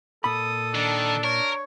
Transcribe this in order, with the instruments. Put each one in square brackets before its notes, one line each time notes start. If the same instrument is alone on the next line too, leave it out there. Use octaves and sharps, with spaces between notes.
[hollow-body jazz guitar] A#2 B5 [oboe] A4 [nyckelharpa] D#6
[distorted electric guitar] D#3 [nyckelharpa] D4
[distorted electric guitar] A#4 [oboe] C#5